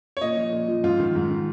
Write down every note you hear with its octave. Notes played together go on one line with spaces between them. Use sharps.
C#5
A#2 D#5
F3
A#2
F3
G#2 F4
D#3
G#2
D#3